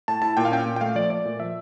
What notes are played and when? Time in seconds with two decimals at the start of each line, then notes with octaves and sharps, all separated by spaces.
0.08 A2 A5
0.22 E4 A5
0.37 A#2 G5
0.45 F5
0.52 C#4 G5
0.66 A#2
0.76 G5
0.81 A3 F5
0.95 F3 D5
1.10 A3 D5
1.25 A#2
1.40 F3 E5